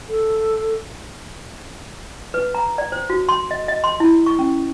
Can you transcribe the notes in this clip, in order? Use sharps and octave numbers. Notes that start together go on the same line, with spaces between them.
A4
B4
A#5
D5
C5
F#4
C6
D#5
D#5
C6
E4
C#6
C#4